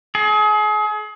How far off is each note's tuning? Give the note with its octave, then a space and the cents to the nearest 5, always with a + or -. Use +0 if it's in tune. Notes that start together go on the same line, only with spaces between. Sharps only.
G#4 +35